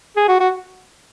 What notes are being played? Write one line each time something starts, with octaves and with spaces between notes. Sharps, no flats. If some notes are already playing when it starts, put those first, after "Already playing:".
G#4
F#4
F#4